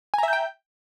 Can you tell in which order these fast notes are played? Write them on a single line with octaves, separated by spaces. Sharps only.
G#5 A#5 E5 G6 G5